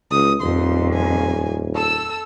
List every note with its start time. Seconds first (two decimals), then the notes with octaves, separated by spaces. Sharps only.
0.11 C#2 D#6
0.41 D#1 F2 C6
0.94 G#5
1.76 A4 E6